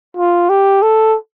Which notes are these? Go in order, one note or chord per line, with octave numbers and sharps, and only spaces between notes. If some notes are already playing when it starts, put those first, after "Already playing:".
F4
G4
A4